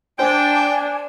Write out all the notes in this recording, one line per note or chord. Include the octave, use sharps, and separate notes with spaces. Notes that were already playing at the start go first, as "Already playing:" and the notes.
D4 C5 G5 G#5